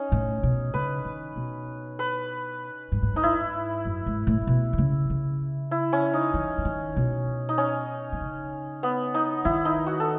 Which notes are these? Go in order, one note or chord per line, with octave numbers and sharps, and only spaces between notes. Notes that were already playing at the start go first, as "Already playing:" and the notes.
Already playing: C#4 D#4
A2
B2
C#3 B4
D#3
B2
B4
G#2
A2
G#2 D#4
E4
F#2
G#2
A2
A2
B2
D#3
C#3
C#3
E4
C#4
D#4
E3
E3
D#3
B2
D#4
C#4
D#3
C#3
B3
D#4
D#3 E4
D#4
F#4
A4